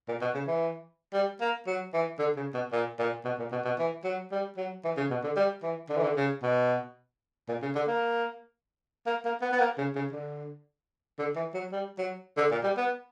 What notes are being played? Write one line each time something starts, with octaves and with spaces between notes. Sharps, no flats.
A#2
B2
C#3
E3
G3
A#3
F#3
E3
D3
C#3
B2
A#2
A#2
B2
A#2
B2
B2
E3
F#3
G3
F#3
E3
C#3
B2
D3
G3
E3
D3
E3
D3
C#3
B2
A#2
C#3
D3
A#3
A#3
A#3
B3
B3
A#3
C#3
C#3
D3
D3
E3
F#3
G3
F#3
D3
A#2
G3
B3